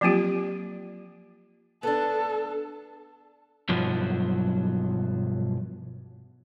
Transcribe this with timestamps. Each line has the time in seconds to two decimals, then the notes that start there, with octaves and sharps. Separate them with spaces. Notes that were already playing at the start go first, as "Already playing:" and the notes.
0.01 F3 F#3 A#3 C4 F4 G4
1.83 B3 D4 A4
3.69 B1 G2 F3 F#3